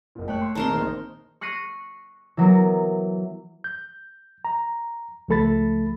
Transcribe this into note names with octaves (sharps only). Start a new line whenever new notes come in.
F#1 A#2
A3 C#5 G5 F#6
C6
A#1 D#3 C4 D#4 A#4 A5 C6 E7
A#1 D#3 C5
C#6 F#6 A#6 C7 D#7
E3 F#3 B3 A#4
G6
A#5
C#2 F3 A3 A4 B5 A6